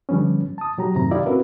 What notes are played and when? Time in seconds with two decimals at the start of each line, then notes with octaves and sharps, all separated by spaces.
0.09 D3 F3 G3 B3 C#4
0.58 A5 D#6
0.78 B2 F#3 G4 A#5
0.95 F#2 A2 C3 D#3 A#5
1.11 E4 F4 G4 D5 D#5 F5
1.26 C4 C#4 F#4 A#4 B4